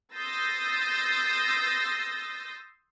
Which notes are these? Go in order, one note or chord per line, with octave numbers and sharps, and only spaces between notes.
C6 D#6 E6 G6 A6 A#6